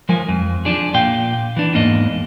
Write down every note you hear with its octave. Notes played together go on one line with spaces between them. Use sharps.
F3 G#3 A#4 G#5
F2
F3 D4 G#4
A#2 F5 G5
E3 D4
E2 G#2 A#3 D#5